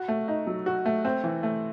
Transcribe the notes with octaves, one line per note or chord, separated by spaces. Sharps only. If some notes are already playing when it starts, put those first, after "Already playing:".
Already playing: F#4
A3
D#4
F#3
F#4
A3
C4
E3
A3